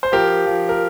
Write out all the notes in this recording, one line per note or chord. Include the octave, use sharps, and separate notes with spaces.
C5
F3 G4 A#4
F3
A#4